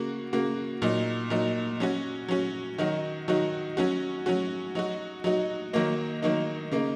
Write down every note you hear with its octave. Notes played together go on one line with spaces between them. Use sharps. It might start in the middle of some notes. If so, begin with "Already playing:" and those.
Already playing: C#3 A#3 F#4
C#3 A#3 F#4
A#2 F#3 D#4
A#2 F#3 D#4
F#3 C#4 F#4
F#3 C#4 F#4
D#3 F#3 D#4 F#4
D#3 F#3 D#4 F#4
F#3 C#4 F#4
F#3 C#4 F#4
F#3 D#4 F#4
F#3 D#4 F#4
D#3 F#3 A#3 D#4
D#3 F#3 A#3 D#4
C#3 A#3 D#4